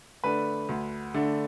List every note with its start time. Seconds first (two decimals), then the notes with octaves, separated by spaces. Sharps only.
0.24 D3 A3 D4 B4
0.69 D2
1.14 D3 A3 D4